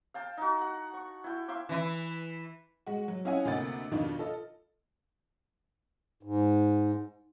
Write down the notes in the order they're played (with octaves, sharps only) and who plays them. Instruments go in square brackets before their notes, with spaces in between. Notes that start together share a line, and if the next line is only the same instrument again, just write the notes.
[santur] F5 G5 A5
D#4 F#4
F#5
C#6
E4 G5
E5 F5 C6 D6
[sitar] E3 E4
[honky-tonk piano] G#3 F#4
F#3
C#4 E4 D#5 F5 F#5 G#5
D2 C3 A#3 D#5 F#5 A6
F2 B2 D#3 D4 D#4 F4
F4 A4 D#5
[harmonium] G#2